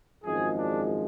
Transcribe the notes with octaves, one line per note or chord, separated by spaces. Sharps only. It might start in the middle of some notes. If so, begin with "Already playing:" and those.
G#1 F#2 F3 G#3 G#4
D4